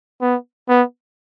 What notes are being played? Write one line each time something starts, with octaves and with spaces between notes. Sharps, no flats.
B3
B3